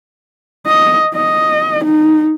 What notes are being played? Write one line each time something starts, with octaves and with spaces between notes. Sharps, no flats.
D#5
D#5
D#4